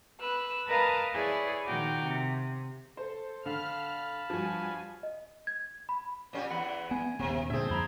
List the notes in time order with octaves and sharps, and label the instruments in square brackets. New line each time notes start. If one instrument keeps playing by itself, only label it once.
[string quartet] B4 E6 F#6
A#4 B4 D#5 F5 A5 A#5
E4 G#4 B4 C#5 D5
A#2 D#3 F#4 G5 D6 F6
C3
[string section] A4 [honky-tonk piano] C5
[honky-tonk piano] D3 [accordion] F5 A5 B5 [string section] F6
[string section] G2 G#5 [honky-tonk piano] F3 F#4
[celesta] D#5
G#6
B5
[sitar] A#2 C#4 G4
[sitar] E2 [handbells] F#5 B5
[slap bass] B3 [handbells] G#5
[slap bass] D#1 B3 C#4 [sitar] C3
[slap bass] A#2 D3 [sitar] C4 E5 [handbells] D4 G#4
[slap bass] F2 [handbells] A#5 B5 G#6